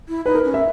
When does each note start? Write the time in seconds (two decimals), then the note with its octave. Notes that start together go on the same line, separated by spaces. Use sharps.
0.09 E4
0.26 D#4 B4
0.35 A#4
0.44 C#4
0.54 E5